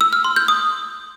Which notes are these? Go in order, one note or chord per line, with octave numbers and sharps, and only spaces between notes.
E6
F6
C6
G6
D#6